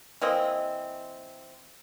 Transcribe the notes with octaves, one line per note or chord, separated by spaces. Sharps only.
E3 A#3 C4 D#5